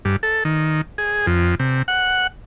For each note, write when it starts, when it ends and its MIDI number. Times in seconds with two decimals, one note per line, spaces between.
0.05 0.16 43
0.23 0.44 69
0.45 0.81 51
0.98 1.26 68
1.27 1.55 41
1.59 1.82 48
1.88 2.27 78